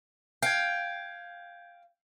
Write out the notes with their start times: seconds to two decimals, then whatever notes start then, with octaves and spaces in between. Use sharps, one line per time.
0.42 F5 G5 G6 G#6